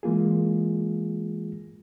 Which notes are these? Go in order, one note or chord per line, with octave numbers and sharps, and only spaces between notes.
E3 G#3 A#3 F4 G#4